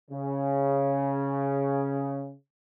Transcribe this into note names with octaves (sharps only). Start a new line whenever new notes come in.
C#3